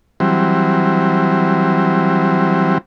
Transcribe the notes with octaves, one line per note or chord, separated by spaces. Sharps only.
E3 F#3 G3 C4